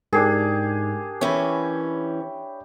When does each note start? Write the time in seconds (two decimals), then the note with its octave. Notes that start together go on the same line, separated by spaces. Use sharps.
0.13 G#2 D4 G4 G#4 A#4 G#6 C7
1.21 E3 C#4 C#5 E5 G5 B5